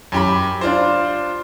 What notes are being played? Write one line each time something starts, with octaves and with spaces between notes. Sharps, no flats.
F#2 G4 B5
D4 F4 C5